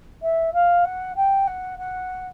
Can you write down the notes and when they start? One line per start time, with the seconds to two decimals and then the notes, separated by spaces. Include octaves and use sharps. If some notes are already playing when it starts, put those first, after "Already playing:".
0.22 E5
0.53 F5
0.85 F#5
1.16 G5
1.47 F#5
1.78 F#5